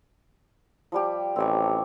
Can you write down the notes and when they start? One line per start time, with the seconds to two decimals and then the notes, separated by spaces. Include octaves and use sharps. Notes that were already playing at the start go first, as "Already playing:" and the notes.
0.92 F3 G3 G4
1.36 A1 C4 C#5 D5